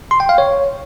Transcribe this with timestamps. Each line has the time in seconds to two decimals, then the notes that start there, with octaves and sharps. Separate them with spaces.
0.11 C6
0.20 G5
0.29 F5
0.38 C#5